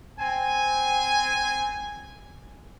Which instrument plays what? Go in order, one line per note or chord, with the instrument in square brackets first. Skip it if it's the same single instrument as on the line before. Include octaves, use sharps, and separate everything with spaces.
[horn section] C4 G#5